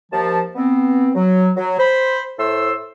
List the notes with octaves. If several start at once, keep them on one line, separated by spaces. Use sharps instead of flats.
D#2 F3 A5
B3 C4
F#3
F#3
C5 B5
A2 A3 A4 C5 C6 E6